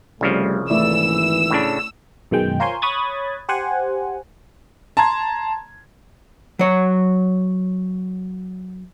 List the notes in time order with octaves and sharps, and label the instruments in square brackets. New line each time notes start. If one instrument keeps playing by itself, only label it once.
[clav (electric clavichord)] C2 C#3 F3 [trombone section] G3 A3
[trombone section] G#1 E3 [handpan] A3 E4 D5 [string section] E6
[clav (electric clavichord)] A2 C#3 D4
[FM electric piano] F#2 B2 D#3 G#3 G5
F4 A#4 C5 C#5 G#5 C6
C#5 B5 D#6 F#6 G#6 A6
G4 C5 F#5 G#5
[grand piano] A5 A#5 C6 G#6
[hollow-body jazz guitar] F#3 C#5